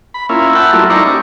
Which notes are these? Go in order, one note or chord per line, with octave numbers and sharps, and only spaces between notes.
B5
A#3 C#4 E4 F4
E5 F#5 G5 A5 B5
F#3 G3 A3 A#3 E4 F4
D#4 E4 C5 D5 A#5 C#6
G3 C#4 D5